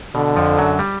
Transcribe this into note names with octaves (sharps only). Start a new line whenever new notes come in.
B2 D3
F2 F3
F#2 F#3
G3